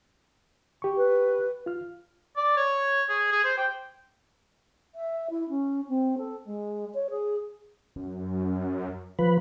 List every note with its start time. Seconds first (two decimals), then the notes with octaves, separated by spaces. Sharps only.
0.82 G4 C#6
0.97 B4
1.66 F4 F6
2.37 D5
2.57 C#5
3.09 G#4
3.32 G#4
3.44 C5
3.58 G5
4.95 E5
5.30 E4
5.49 C#4
5.88 C4
6.17 A4
6.45 G#3
6.94 C#5
7.10 G#4
7.96 F#2
9.19 F3 B4